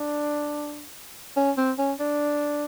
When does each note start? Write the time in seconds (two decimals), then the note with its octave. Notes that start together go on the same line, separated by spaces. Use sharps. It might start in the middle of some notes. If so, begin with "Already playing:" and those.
Already playing: D4
1.37 C#4
1.57 C4
1.79 C#4
2.00 D4